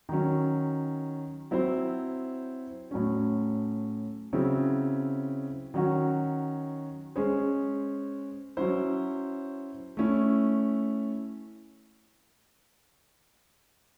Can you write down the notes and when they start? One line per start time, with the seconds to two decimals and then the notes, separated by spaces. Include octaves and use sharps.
0.09 D#3 F#3 C#4
1.51 F#3 C4 E4 C5
2.91 A2 F#3 C#4
4.33 C#3 F#3 C4 E4
5.74 D#3 F#3 C#4 F#4
7.16 G#3 C#4 G#4 C5
8.57 F#3 C#4 E4 C5
9.97 A3 C#4 E4